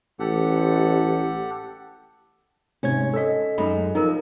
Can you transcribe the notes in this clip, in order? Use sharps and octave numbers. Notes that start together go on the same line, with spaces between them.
A1 G4 A4 F#5
G#2 C3 C#4 C#5 G#6
A4 D#5 E6 B6
F#2 G#3 D#4 B5
F3 D#4 A#4 A#5